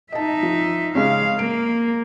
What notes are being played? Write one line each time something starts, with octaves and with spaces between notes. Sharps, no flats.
D#4 D#5 E5 A5
F3
C#3 G#3 C#4 F5
A#3 D7